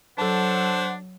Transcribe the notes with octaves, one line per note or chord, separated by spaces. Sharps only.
F#3 D4 A4 C5 F#5 A5